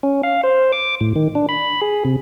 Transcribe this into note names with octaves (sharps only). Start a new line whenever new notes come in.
C#4
F5
C5
D6
A2
D#3
D4
B5
G#4
C3